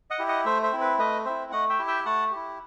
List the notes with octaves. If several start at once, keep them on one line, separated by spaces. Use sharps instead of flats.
D#5 F#5
E4 G4
D#5 F#5
A3 C5 E5
C5 E5
C4 E4
B4
A3 B4 D#5
C4 E4 C5 E5
A3 D#5 F#5
E5 G5
E4 G4
E5 G5
A3 F#5 A5
E4 G4